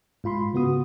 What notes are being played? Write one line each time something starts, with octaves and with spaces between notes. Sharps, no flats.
G#2 F4 B5 C6
C#3 B3 F#4 D#6